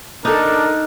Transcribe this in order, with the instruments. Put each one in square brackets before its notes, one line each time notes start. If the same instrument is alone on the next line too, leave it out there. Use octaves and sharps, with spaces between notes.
[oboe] D4 [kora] D#4 A4 [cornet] A#4